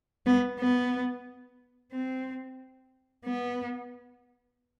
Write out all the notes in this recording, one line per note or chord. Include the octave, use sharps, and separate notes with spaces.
B3
B3
C4
B3